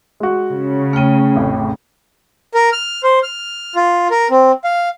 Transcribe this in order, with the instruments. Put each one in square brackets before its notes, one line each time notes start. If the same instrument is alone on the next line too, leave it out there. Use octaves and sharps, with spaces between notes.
[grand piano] G#3 F#4
[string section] C#3
[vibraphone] A3 G5 [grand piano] F6 D#7
[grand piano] A1 F2 A2
[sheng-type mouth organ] A#4
F6
C5
F6
F4
A#4
C4
F5